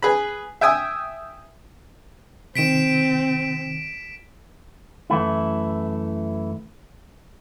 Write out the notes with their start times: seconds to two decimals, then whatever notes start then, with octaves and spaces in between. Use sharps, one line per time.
0.02 G#4 B4 B5
0.61 E5 G5 G#5 D#6 E6
2.56 C3 D#3 C4 B6 D7 E7
5.10 F#2 E3 A3 E4